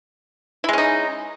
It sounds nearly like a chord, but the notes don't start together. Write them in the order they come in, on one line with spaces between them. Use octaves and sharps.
E4 G#3 C#4 D#4